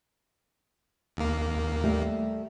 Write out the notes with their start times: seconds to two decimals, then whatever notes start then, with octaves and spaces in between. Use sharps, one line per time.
1.17 D#2 A#3
1.84 G3 A3 G4